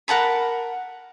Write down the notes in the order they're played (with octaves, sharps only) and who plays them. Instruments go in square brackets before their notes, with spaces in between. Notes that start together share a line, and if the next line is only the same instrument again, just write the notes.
[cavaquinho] A#4 F#5 A5 B5